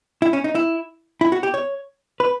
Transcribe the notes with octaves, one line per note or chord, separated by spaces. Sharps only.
E4
C#4
D#4
E4
E4
F#4
G4
C#5
B4